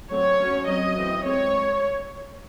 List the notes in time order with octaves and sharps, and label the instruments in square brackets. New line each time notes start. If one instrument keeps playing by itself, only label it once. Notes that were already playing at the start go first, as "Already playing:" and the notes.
[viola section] F#3 A3 C4 C#5
F#3 C#4
F#3 C4 D#5
E3 A3 C4
G#3 C4 C#5